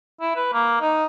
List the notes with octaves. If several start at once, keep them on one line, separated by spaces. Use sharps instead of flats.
E4
B4
A#3
D#4